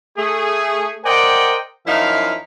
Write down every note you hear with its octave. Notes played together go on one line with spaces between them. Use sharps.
A3 G#4
A#4 C5 D5 D#5 F#5 G5
F#2 F3 D#4 E4 F5